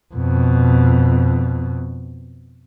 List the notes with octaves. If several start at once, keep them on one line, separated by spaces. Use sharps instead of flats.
F2 B2